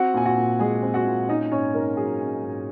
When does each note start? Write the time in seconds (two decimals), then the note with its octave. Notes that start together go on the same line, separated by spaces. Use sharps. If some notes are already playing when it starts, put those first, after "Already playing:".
Already playing: C4 F#4 F#5
0.14 A#2 G#5
0.26 F#4 F#5
0.37 A#2
0.60 G#3 G#4 G#5
0.83 C4
0.94 F#4 F#5
1.07 A#2
1.28 C#4 D#4 D#5
1.51 G#2 C#4 C#5
1.74 G#2 A#4
1.97 F#3 G#4
2.21 C#4
2.43 G#2